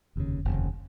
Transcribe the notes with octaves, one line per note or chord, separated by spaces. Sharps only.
F1 D#2 C#3
F1 D#2 C#3